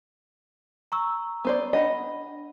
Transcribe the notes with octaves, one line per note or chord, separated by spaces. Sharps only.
A#5 C#6 E6
B3 C5 D5
D4 D#5 F#5 B5